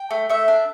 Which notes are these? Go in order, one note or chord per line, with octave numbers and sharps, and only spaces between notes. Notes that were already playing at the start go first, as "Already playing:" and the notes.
Already playing: G5
A3
A3 E5
D4